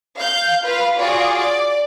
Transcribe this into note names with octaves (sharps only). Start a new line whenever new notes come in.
F5 G6
F4 B4 F5
F4 F#4 G#4 D5
D5